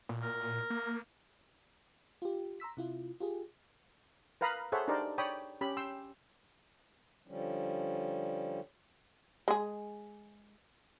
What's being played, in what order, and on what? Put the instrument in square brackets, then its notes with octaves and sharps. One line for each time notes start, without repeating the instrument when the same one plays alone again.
[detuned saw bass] A#2
[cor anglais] A#4
[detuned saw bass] A#3
[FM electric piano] F4 G4
A#5 C6 E6 B6
C3 E4 F4
F4 G4 G#4
[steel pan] A#4 B4 F5 A#5 B5 D#6
G#4 A4 C5 C#5 E5 F#5
D4 D#4 G4 A#4 C5 D5
C#5 D5 G5 B5 D#6
C#4 G4 B5
G5 C6 E6
[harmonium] D3 F3 G3 C#4
[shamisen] G#3 G#4